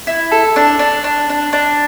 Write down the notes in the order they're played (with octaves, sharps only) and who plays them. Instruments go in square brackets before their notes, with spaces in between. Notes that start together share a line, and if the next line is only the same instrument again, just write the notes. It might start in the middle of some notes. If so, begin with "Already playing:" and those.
[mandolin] E4
A4
D4
D4
D4
D4
D4